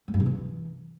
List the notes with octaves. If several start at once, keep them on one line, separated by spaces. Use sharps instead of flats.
G3
G2
C3
E3